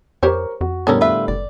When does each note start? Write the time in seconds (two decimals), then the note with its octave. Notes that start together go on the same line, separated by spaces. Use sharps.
0.23 F2 G4 A#4 C5 C#5 C#6
0.61 F2 F#4
0.87 A2 D3 G3 B3 C#4 A4 A#4 C#5
1.01 F4 B4 E5
1.28 F#1 D5